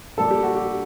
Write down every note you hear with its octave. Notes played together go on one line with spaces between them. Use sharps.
A#2 G3 A4
G4
F#4
G4